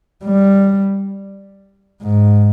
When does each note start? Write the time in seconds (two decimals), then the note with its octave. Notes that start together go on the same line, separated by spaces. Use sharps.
0.25 G3
2.02 G#2